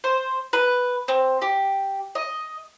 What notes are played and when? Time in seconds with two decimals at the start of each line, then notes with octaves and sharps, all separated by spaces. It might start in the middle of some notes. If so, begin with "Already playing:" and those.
0.04 C5
0.53 B4
1.08 C4
1.42 G4
2.15 D#5